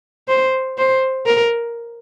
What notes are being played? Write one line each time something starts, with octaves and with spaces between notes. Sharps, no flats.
C5
C5
A#4